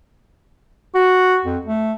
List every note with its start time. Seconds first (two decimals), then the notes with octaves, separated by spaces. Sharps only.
0.95 F#4
1.45 F2
1.66 A3